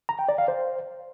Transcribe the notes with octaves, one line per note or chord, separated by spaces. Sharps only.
A#5
G5
D5
F5
C5